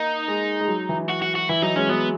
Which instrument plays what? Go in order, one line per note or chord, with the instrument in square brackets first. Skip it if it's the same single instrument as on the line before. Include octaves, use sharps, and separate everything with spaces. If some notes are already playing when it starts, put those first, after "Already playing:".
Already playing: [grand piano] A#3 [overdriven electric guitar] D#4
[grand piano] G#3
G#3
F#3
E3
[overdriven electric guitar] F#4
F#4
F#4
[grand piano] E3 [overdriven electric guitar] E4
[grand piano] F#3 [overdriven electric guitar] D#4
[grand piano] G#3 [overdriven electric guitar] C#4
[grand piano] F#3 [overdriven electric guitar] B3